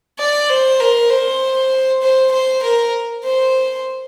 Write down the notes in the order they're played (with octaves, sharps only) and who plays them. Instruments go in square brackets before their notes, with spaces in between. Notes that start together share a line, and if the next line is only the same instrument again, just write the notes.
[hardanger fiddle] D5
C5
A#4
C5
C5
C5
A#4
C5